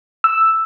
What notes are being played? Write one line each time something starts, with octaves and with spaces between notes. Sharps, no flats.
E6